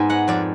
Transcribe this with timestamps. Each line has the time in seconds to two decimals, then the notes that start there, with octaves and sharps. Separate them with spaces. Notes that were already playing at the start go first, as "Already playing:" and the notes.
Already playing: G#2 B3 G#5
0.10 G#3 F#5
0.28 F2 D5